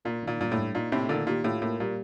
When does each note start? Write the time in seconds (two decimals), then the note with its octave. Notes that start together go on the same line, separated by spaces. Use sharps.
0.05 A#2 A#3
0.23 A#2 D#3
0.39 G2 A#2
0.52 A2
0.57 G2
0.75 A#2 D#4
0.92 A2 C3 A3
1.09 A#2 D3 D#3
1.27 A#2 G4
1.44 A2 F4
1.62 A2 A#3
1.80 A#2 G3